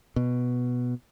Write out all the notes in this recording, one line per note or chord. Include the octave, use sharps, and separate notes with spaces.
B2